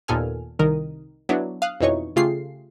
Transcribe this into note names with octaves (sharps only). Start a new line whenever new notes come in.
D#2 A#2 B3 A4 G#5 F6
C2 D#3 A#4 D#6
F#3 B3 D4 E4
F5 D#6 F#6
F2 B2 E3 D#4 C#5 C#6
C#3 A3 F4 G4 G#4 C7